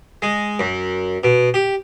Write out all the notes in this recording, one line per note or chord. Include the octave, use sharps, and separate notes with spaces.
G#3
F#2
B2
G4